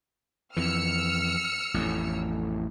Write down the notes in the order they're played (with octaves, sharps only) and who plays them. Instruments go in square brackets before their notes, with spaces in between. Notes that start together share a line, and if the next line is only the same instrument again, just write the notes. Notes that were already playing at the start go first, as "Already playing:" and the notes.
[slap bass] F2 E3 [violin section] E6 F6 C#7
[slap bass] A1 F2 A2